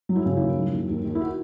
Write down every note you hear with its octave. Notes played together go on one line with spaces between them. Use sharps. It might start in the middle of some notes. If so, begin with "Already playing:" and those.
F#3
E4
C#3
E4
D#2
F#3
D#2
D#2
D#2
E4
F#4